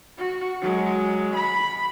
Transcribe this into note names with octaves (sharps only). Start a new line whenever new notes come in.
F#4
F#3 G#3
B5